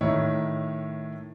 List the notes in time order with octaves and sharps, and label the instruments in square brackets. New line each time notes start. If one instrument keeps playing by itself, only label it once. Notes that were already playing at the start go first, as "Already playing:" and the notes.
[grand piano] A2 D#3 E4 C#5